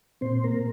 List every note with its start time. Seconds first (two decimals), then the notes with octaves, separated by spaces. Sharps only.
0.21 A#2 C4 C5
0.44 A#3 A#4
0.51 A#2